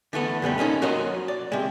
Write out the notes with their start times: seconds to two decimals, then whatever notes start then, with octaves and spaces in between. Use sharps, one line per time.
0.13 D3 E3 A3 B3
0.42 F#2 B2 D3 G3
0.58 A#3 C#4 D#4 A4
0.82 F#3 F#4 A#4 C5 C#5 D#5
1.28 D5
1.52 C3 G#3